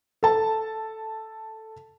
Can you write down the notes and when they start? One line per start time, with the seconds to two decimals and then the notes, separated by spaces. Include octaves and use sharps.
0.23 A4 A5